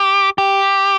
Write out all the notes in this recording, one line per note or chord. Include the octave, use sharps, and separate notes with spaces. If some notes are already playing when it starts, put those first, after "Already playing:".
Already playing: G4
G4